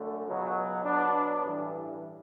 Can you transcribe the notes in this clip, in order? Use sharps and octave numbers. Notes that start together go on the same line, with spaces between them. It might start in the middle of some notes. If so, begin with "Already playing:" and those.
Already playing: F#2 D3 A3
C#2 B2 F#3
B2 F#3 B3 D4
A1 G2 E3 G3